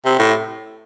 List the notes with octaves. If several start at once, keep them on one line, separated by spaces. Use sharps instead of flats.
C3
A2